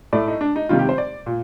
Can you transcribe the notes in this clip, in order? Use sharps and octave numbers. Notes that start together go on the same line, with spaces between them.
A2 A3 D5
D#4
D4
D#4
C3 D#3 G3 F4
G4
C5
D5
A#2